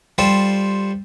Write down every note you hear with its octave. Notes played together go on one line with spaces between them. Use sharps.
G3 F4 G4 A4 C5